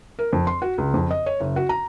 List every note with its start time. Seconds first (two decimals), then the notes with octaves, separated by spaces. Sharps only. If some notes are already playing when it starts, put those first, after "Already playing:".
0.19 A#4
0.33 F2
0.47 C6
0.62 F#4
0.78 C#2
0.94 F2
1.11 D#5
1.26 C#5
1.40 F#1
1.56 F#4
1.69 A#5